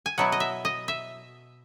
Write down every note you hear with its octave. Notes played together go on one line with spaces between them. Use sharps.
G#5
B2 F#3 B3 E4 F#5
D#5
E5
D#5
E5